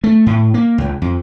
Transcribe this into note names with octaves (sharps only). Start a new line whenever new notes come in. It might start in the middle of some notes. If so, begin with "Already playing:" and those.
A3
A2
A#3
C#2
F2